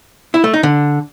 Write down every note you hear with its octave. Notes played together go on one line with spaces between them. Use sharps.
E4
A3
D#4
D3